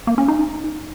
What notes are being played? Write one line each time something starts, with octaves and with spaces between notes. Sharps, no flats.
A#3
C#4
D#4